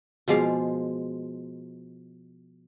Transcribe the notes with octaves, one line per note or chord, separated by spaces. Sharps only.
B2 F3 G#3 D5 F5